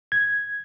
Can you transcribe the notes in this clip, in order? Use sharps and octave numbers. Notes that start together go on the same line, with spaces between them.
G#6